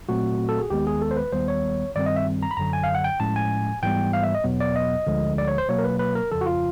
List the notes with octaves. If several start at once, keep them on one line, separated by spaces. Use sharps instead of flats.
A#2 F#3 A3 C4 F#4
A4
G#4
D#2 D#3 G#3 B3 G4
G#4
A4
C5
B4
D#2 D#3 G3 B3 C5
C#5
G2 D#3 G3 C4 D5
D#5
E5
A#5
B5
F#2 D3 F#3 A#5
G#5
F5
F#5
G5
A2 F3 G#3 C#4 A5
G#5
G#2 E3 G3 B3 G5
F5
E5
D#5
E2 B2 F#3 B3
D5
D#5
D2 D3 F3 G#3
D5
C#5
C5
B2 F#3 A#3 C#5
A#4
B4
B4
A#4
F2 C#3 F3 A4
F#4
F4